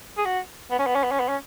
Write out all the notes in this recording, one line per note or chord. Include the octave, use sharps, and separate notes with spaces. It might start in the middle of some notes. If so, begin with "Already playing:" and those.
G#4
F#4
B3
C#4
B3
C#4
B3
C#4
B3
C#4